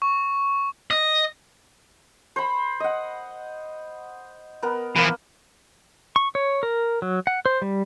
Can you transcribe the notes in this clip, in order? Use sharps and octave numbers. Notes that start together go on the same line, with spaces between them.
C#6
D#5
C5 B5
D#5 F#5
B3 A#4
E3 F3 A#3 B3 B4
C#6
C#5
A#4
F#3
F#5
C5
G3